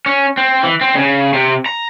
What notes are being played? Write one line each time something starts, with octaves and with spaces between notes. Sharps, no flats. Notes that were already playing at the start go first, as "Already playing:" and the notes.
C#4
C4
E3
C4
C#3
C3
A#5